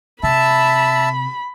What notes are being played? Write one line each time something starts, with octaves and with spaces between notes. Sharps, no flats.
C3 E5 A5 B5